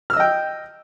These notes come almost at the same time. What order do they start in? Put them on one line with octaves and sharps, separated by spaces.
F6 E6 D#5 G5